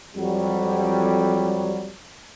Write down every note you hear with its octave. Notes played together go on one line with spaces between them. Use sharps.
F2 F#3 G3